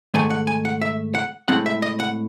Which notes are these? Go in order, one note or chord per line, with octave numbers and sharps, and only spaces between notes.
G#2 D#3 A3 G#5
F#5
G#5
F#5
E5
F#5
A2 G#3 C4 F#5
E5
D#5
F#5